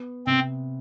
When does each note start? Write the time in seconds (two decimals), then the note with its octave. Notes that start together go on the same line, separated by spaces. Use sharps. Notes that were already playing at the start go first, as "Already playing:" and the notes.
Already playing: B3
0.27 C3 C4